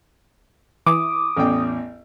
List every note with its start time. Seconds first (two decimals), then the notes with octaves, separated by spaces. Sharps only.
0.87 E3 D6 D#6
1.36 A1 E2 G5